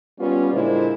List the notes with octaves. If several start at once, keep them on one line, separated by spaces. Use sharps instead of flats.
G3 B3 C#4 F4 B4
A#2 D3 G#3 E4 C5